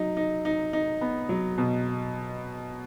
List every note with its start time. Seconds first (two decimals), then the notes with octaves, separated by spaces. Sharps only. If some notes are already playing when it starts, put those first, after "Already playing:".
Already playing: F#3 D#4
0.17 D#4
0.45 D#4
0.73 D#4
1.01 B3
1.29 F#3
1.58 B2